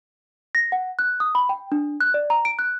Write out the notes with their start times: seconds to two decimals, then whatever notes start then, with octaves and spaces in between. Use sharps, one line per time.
0.55 A#6
0.72 F#5
0.99 F#6
1.20 D#6
1.35 B5
1.49 G5
1.72 D4
2.01 F#6
2.14 D5
2.30 A#5
2.45 D7
2.59 F#6